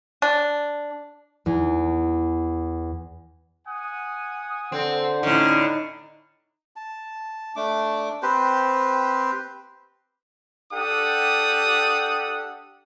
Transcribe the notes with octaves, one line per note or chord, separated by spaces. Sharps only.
D4
E2
F#5 G#5 D#6
D3 C4 C5 F#5
A2 D3 C#4 D#4
A5
A3 D4 D6
C4 G4 B4 C5
D4 G4 A4 F#5 D#6